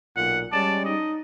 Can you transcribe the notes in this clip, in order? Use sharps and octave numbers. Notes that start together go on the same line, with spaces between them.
B1 A#2 F#5
G3 G#3 C#4 D5 A5
D#4 D#5